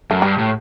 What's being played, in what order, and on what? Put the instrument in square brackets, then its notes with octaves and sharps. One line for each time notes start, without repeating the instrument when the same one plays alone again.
[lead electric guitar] F#2 [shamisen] A3
[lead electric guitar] G2 [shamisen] G3
[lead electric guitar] A2